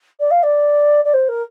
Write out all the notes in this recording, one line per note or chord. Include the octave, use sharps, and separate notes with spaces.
D5
F5
D5
D5
C5
A#4